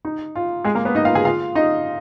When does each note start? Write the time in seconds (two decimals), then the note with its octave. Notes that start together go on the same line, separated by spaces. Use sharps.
0.05 D#4
0.36 F4
0.64 G#3 G#4
0.75 A#3 A#4
0.85 B3 B4
0.95 D#4 D#5
1.05 F4 F5
1.15 G#4 G#5
1.25 F4 F5
1.55 D#4 D#5